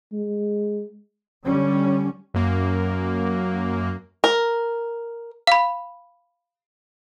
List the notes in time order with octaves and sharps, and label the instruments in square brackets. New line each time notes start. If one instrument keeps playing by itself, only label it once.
[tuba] G#3
[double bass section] D3 G3 C#4
[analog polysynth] F#2 A#3
[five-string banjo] A#4
[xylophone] F5 B5